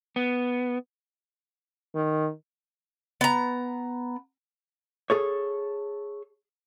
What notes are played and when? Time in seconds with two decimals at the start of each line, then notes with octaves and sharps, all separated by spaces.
0.16 B3
1.95 D#3
3.21 B3 A#5
5.10 G#4 A4 C#5